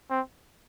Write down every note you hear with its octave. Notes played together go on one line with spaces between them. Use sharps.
C4